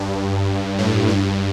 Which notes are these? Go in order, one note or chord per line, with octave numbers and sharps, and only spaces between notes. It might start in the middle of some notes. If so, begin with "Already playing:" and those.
Already playing: G2
A2
G2